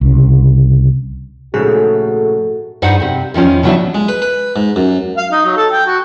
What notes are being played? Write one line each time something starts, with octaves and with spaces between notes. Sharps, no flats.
C2 C#3
A#1 G#2 C#3 A3 F#4 G#4 A4
G2 D#4 G#4 B4 C5 F#5
C3 C4
E2 D#3 F3 C#4
C#3 E3 F#3 B3 D4 E4
G#3
B4
B4
G#2
F#2
F5
D#4
F#3
A4
G5
F#4